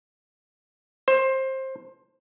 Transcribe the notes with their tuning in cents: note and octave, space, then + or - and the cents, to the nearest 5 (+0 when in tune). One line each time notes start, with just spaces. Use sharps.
C5 +20